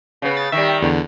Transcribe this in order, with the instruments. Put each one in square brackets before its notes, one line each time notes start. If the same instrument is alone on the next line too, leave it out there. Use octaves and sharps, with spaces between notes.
[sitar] C#3 B3
[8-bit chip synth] A6
[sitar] D#3 G3 [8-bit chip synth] E5
[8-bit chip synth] E2 D3